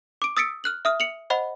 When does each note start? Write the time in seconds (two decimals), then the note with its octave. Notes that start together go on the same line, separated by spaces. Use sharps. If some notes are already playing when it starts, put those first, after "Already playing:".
0.22 D6 D7
0.37 D#6 E6 A6 B6 C#7 D7
0.64 F6 F#6 F#7
0.85 E5 D#6 F6
1.00 C#7 F7 F#7
1.30 C5 D#5 F#5 B5